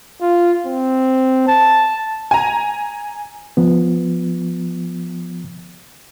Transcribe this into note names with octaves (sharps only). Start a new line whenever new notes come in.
F4
C4
A5
G#5 A#5
F3 B3